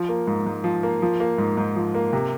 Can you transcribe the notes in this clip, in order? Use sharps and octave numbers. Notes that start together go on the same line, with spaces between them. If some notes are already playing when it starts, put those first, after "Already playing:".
Already playing: F3
A#3
G#2
G#2
F3
A#3
F3
A#3
G#2
G#2
F3
A#3
C3